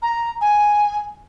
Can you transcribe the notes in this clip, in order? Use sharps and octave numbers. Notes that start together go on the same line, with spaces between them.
A#5
G#5